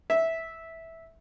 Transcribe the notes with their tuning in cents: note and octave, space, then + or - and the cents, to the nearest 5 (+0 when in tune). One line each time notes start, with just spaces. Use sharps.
E5 -10